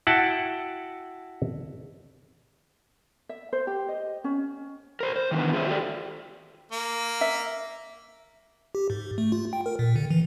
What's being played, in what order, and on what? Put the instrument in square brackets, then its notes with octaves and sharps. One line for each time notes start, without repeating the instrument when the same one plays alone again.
[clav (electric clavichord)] E4 F#4 F#5 G5 A5
[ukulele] E5
C5
G4
D#5
C#4
[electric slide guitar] A#4 C5
C5
D#3 E3 B3 D4
F4 G#4 C5 E5
F#4 G4 A4 D5
[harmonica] A#3
[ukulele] E5
[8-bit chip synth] G4
G#2
A3
F4
G5
A#4
A#2
D3
E3